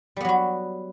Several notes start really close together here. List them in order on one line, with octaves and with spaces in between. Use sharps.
G3 B3 F#3 F#4